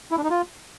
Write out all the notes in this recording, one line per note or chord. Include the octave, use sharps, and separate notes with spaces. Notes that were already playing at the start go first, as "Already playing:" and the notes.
E4
D4
D#4
F4